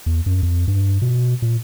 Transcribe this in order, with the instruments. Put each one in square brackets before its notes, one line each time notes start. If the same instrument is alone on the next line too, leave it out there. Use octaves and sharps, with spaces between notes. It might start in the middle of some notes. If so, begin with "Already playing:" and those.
[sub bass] E2
F#2
F2
G2
B2
A#2